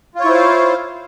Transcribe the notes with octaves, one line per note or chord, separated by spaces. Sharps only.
E4 F4 C5 C#5 F5